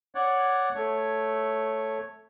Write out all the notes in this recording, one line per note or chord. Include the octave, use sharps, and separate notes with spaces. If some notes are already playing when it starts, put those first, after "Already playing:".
C#5 D5 F#5
A3 C#5